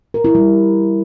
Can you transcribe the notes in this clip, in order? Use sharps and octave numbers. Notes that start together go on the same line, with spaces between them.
A#4
E4
G3